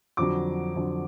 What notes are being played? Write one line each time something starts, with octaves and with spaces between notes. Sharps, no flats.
F2 D3 F#3 D6
F2 D3 F#3